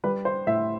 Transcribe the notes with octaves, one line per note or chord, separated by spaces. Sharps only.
G3 B4
C5
A2 E5